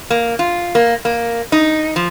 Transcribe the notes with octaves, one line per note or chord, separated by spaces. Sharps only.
A#3
F4
A#3
A#3
D#4
F3